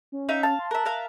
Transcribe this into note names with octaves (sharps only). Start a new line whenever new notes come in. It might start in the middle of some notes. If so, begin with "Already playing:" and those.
C#4
D#4 E5 F5
F5 A5
C6
A#4 E5 F#6
A#4 E5 F5